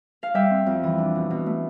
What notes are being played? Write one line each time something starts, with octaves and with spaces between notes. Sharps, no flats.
F5
G3 E5 G5
C4
F2
E3
D4
B2
B2
A3